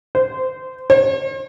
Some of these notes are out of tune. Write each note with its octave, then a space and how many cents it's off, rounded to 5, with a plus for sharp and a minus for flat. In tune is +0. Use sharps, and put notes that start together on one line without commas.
C5 -20
C5 +45